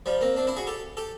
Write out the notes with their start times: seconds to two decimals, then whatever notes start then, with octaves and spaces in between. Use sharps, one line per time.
0.06 F3 G3
0.21 A#3 C4
0.36 C4 D4
0.47 D4 E4
0.56 F#4 G#4
0.67 G4 A4
0.97 G4 A4